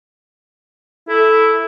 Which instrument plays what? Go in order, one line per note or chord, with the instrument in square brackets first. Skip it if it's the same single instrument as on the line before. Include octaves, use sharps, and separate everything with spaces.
[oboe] E4 [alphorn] A4